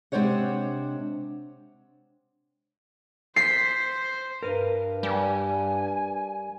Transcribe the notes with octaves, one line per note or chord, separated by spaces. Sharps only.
C3 G#3 D4 C5 C#5 F#5
C5 B6 C7
G2 A#4 B4
G3 G#5